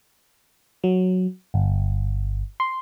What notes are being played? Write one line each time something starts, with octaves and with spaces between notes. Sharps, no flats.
F#3
G1
C6